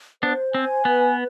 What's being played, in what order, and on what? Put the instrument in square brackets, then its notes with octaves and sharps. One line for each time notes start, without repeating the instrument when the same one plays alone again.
[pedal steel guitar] B3 D4 [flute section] C5
[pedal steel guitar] C4 [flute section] G#5
[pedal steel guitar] B3 [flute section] B4